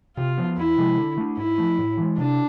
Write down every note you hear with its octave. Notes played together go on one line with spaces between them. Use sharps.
C3 F4
F3 B3
E2 E4
C3 F3 G#3
D3
A3 D4
G#2 E4
F3 A3
A2
E3 G#3
C3 D4